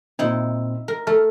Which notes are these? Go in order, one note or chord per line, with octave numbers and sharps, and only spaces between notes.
A#2 C4 D#4 E4
A#4
A3 A4 F6